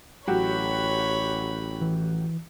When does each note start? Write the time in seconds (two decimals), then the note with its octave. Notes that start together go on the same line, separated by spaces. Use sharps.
0.27 A1 F#3 F#4 G4 C#5 B5
1.81 E3